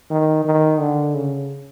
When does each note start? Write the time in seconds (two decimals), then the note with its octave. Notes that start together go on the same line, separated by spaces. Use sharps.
0.10 D#3
0.45 D#3
0.80 D3
1.15 C#3